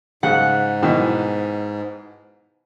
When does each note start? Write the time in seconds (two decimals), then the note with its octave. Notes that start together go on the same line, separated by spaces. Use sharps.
0.23 G#2 C#3 F#5
0.83 B2 D#3 E3